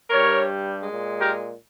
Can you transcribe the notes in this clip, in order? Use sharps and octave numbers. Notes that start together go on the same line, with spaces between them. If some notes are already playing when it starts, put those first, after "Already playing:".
G2 G3 A#4 C#5
A#2 G#3
G4 A#4